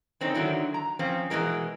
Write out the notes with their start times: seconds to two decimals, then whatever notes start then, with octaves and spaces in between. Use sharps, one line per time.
0.21 D3 C4 C#4 D#4
0.34 D3 D#3 F#3 E4
0.74 A#5
0.99 F3 C4 C#4
1.30 B2 D#3 E3 G#3 A#4